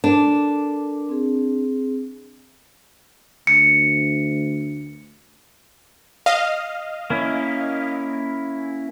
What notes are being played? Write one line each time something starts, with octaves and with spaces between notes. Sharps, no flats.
D4 A4 A#4 D6
C4 G#4
D2 C#7
D#5 F5
A#3 C#4 E4